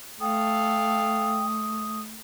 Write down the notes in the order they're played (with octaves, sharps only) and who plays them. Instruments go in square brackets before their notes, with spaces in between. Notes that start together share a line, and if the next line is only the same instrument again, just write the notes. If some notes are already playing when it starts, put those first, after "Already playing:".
[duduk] A3 [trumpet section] A4 F5 [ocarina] G5 [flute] D#6